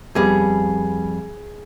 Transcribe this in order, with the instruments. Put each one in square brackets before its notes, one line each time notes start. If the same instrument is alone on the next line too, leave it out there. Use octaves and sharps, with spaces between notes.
[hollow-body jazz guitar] F2 G3 B3 [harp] G#4